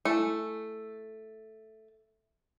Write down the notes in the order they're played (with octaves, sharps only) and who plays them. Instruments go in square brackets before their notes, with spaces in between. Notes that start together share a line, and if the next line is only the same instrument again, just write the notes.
[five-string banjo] A3 [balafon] E4 G#5